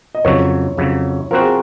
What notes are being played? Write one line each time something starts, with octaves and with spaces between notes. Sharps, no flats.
D#5
F2 C#3 F#3 C#5
F2 C#3 F#3
F3 C4 F#4 A#4
G#4